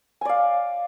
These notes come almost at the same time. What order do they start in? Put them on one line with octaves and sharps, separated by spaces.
G#5 D5 F5